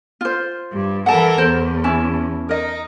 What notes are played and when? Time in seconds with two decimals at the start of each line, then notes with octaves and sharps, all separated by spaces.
0.21 F4 C5
0.71 G2
1.06 E3 A4 A#4 F#5 A5
1.38 E2 C5
1.84 C#4 E4 A5
2.49 D#4 A#4 D#5